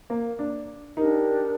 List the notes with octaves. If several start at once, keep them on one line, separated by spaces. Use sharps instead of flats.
A#3
D4
D4 D#4 G4 A#4